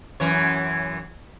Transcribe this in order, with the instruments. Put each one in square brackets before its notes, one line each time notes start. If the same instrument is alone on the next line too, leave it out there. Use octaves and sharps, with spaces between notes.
[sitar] F#2 E3 C#5